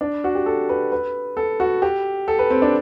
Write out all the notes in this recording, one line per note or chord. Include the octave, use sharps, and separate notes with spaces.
D4
F#4
G4
A4
B4
B4
A4
F#4
G4
A4
B4
C4
D4